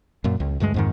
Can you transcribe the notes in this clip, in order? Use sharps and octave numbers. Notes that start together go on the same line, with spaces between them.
F#2 A#2
C#2
D2 G2 D#3 G#3
F2 G#2 D#3